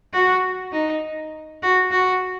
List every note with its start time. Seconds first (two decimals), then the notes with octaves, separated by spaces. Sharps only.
0.13 F#4
0.72 D#4
1.63 F#4
1.91 F#4